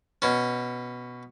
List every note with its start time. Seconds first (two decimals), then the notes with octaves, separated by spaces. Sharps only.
0.22 B2 C#4